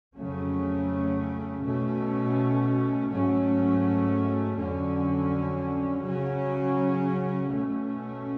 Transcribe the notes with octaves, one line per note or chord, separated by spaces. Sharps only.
F2 C#3 F#3 A3 C#4
B2 A3 C#4
G#2 F#3 A3 C#4
F2 D3 F#3 C#4
C#3 F#3 C#4
B2 A3 C#4